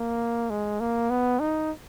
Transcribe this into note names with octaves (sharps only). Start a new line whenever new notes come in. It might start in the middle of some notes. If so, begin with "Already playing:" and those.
Already playing: A#3
G#3
A#3
B3
D#4